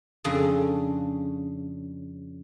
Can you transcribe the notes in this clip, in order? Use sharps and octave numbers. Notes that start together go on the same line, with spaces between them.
F2 C#3 D4 G#4